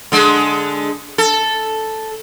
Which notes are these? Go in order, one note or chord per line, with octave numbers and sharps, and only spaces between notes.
D3 G#3
A4